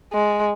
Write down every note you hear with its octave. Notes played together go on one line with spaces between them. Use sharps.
G#3